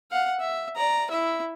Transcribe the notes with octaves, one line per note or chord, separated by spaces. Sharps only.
F5 F#5
E5
D5 A#5
E4 E5